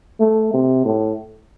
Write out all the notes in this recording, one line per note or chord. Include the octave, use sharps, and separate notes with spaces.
A3
C3
A2